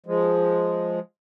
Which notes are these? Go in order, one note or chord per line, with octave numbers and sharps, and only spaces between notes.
F3 G#3